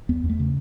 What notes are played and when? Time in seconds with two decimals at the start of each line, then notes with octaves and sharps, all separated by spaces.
0.09 E2 B3
0.24 E2
0.29 A3
0.40 C#3